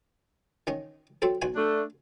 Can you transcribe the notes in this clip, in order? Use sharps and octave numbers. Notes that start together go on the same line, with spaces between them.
D#3 C#4 D#5
F#3 C4 A4
B1 F#4 G#5
A3 D4